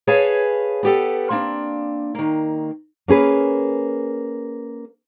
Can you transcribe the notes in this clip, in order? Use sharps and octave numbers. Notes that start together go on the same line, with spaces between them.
G#4 B4 C#5 F5 G#5 A5
B3 G4 A4
A#3 C4 D4
D#3 A#3
A#3 C#4 G#4 B4